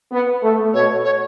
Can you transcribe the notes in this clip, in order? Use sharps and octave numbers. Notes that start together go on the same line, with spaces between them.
B3
A3
B2 C#5
C#5